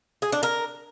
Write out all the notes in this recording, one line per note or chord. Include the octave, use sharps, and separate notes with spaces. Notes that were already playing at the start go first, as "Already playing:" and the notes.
G#4
D4
A#4